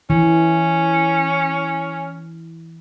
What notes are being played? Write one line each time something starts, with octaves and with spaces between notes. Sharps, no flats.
E3 C#4